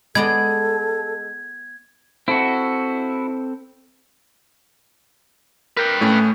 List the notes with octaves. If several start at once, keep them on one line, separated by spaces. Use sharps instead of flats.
G#3 B3 A4 D5 D#5 G#6
C4 E4 F#4 A4
A#4 B4 G5
A2 A3 C#4